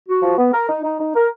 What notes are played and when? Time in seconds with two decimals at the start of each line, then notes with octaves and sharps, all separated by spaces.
0.09 F#4
0.23 F3
0.38 B3
0.53 A#4
0.69 D#4
0.84 D#4
1.00 D#4
1.15 A#4